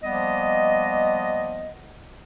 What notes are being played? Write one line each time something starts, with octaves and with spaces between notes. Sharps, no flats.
F3 G3 A#3 B3 D#5